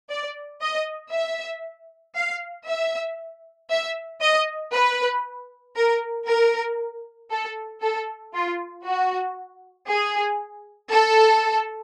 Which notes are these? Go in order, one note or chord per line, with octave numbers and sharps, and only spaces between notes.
D5
D#5
E5
F5
E5
E5
D#5
B4
A#4
A#4
A4
A4
F4
F#4
G#4
A4